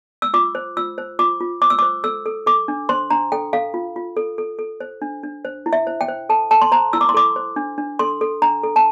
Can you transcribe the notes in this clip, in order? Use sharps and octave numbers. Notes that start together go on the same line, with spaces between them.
E6
F4 D6
C5
F4 E6
C5
F4 D6
F4
C5 D6
E6
C5 D6
A4 E6
A4
A4 D6
D4
C5 C6
D4 A#5
A4 G5
A4 F5
F4
F4
A4
A4
A4
C5
D4
D4
C5
E4
E5
C5
G5
C5
A4 A5
A4 A5
C6
C5 A#5
E4 E6
D6
C6
A4 D6
C5
D4
D4
A4 C6
A4
D4 A#5
A4
A5